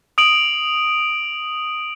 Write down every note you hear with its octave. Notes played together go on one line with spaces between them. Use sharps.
D#6 D7 F#7